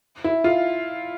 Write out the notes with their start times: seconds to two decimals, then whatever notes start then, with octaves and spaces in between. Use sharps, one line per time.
0.24 E4
0.44 F4